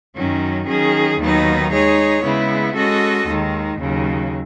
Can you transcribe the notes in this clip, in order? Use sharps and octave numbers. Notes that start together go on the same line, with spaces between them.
F#2 D#3 F#3 C#4
D#3 F#3 C#4 G#4
D#2 D#3 F#3 B3 D#4
G#3 D#4 G#4 C#5
C#3 G#3 B3 E4
G#3 C#4 F#4 A4 D#5
D#2 D#3 G#3
D#2 C#3 F#3